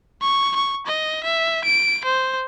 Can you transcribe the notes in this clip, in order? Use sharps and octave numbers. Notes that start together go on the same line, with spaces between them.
C#6
C#6
D#5
E5
D7
C5